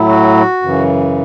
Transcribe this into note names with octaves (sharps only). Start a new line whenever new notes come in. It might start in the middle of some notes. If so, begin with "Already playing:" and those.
Already playing: A2 F#3 E4
F#4
F#2 C#3 E3